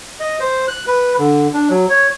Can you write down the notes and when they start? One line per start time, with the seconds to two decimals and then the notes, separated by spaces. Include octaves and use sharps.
0.20 D#5
0.40 C5
0.68 F#6
0.87 B4
1.18 D3
1.54 D4
1.69 F#3
1.89 C#5